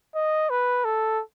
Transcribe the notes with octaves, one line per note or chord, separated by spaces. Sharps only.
D#5
B4
A4